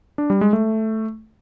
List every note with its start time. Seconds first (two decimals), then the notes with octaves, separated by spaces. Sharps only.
0.18 D4
0.30 G3
0.41 G#3
0.53 A3